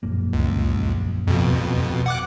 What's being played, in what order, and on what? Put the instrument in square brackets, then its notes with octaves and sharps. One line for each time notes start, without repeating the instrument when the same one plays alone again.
[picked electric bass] A#1 F#2 A#3
[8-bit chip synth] C#2
F2 B2
F#5 D6 F#6